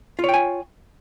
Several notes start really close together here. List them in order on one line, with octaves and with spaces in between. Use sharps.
F4 C#5 G5 G#5